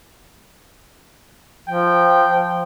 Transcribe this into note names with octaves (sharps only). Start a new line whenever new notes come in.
F3 G5